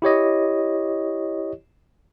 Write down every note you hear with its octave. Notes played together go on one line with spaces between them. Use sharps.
E4 G4 C#5 D#5